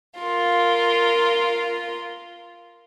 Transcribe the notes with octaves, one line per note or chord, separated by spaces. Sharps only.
F4 A#4